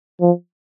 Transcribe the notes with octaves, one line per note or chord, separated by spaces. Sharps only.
F3